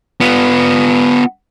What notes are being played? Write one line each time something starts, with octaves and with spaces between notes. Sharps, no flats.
B3 F4